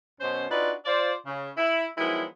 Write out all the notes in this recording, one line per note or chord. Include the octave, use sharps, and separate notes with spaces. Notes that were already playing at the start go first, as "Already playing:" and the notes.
F#2 B2 C#4 C5
D4 D#4 F4 F#4 B4 D5
F4 C5 D5
C#3
E4
D#3 F3 F#3 G#3 B3 E4